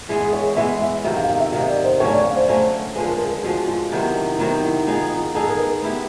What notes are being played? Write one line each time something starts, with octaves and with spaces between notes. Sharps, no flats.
E3 G#3 B3 G#4
G#4
C#5
E3 G#3 B3 E5
E5
C3 D#3 F#3 E5
F5
F5
E5
C3 D#3 F#3 D#5
D5
C5
D3 F#3 A3 C#4 C#5
D5
F5
C5
D3 F#3 A3 C#4 C5
D3 F3 G#3 B4
A#4
G#4
D3 F3 G#3 F#4
F4
C3 D#3 F#3 B3 E4
E4
C3 D#3 F#3 B3 D#4
E4
B3 D#4 F4 G#4
F4
B3 D#4 G#4 A4
A#4
B4
B3 E4 G4